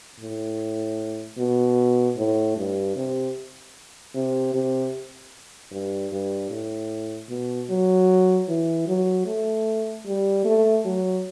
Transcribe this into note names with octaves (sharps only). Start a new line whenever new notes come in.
A2
B2
A2
G2
C3
C3
C3
G2
G2
A2
B2
F#3
E3
F#3
A3
G3
A3
F#3